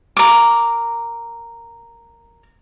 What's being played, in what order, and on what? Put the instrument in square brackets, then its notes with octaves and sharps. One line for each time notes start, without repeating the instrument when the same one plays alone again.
[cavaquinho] A#4 D6